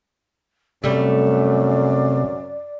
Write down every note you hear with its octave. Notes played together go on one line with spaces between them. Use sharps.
F#2 C3 G3 A3 D5